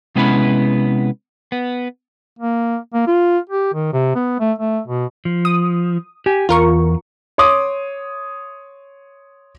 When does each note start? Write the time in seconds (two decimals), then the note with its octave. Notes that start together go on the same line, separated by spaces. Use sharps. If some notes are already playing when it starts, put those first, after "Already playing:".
0.16 C3 G#3 B3 C#4 E4 B4
1.52 B3
2.39 A#3
2.94 A#3
3.07 F4
3.49 G4
3.74 D#3
3.93 C3
4.15 B3
4.40 A3
4.58 A3
4.87 B2
5.25 F3
5.45 D#6
6.26 G4 G#5
6.49 E2 F4 A#4 C#6
7.38 C#5 C6 D6 D#6